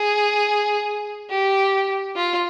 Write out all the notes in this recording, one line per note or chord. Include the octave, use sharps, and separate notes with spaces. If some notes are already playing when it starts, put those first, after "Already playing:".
Already playing: G#4
G4
F4